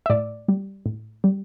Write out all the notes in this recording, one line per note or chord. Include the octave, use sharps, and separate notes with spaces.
E5
A2 D5
G3
A2
G3